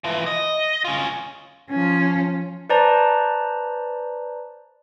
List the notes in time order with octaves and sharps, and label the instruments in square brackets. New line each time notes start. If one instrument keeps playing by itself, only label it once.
[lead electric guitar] E3 F3
D#5
C#4 F4
[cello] F3 C#4
[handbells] B4 C5 D5 A5 A#5